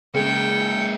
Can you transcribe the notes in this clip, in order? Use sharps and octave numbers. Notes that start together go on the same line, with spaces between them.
C#3 G#3 A#3 G5 C#7